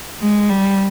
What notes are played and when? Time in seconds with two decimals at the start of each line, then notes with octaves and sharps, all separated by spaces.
0.21 G#3
0.49 G3